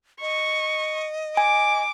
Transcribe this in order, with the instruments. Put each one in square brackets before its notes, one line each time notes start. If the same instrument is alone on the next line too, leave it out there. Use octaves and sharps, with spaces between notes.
[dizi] D#5 [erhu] C#6
[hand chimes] G#5 [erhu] D6